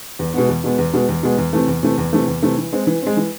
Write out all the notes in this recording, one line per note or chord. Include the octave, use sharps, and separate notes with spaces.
E2
B2 G#3 B3
E2
B2 G#3 B3
E2
B2 G#3 B3
E2
B2 G#3 B3
E2
C3 E3 A3
E2
C3 E3 A3
E2
C3 E3 A3
E2
C3 E3 A3
E3
G#3 C4
E3
G#3 C4
E3